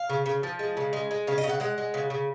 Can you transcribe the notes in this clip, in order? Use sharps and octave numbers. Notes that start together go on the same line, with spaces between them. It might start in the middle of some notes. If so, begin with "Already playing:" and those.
Already playing: F5
C#3
C#3
F3
G#3
C#3
G#3
G#3
C#3 F5
D#5
C#3
F#5
G#3 F#5
G#3
C#3
C#3